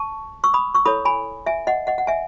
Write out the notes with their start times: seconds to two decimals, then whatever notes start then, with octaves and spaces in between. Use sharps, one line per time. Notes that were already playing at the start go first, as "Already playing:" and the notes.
Already playing: A5 C#6
0.44 C#6 E6
0.54 B5 D#6
0.75 C#6 E6
0.86 E4 A4 C#5 B5 D#6
1.05 G#5 B5
1.46 E5 G#5
1.67 D#5 F#5
1.87 D#5 F#5
1.98 F#5
2.07 E5 G#5